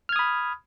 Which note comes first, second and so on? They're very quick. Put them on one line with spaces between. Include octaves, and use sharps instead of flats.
F6 G#6 D#6 B5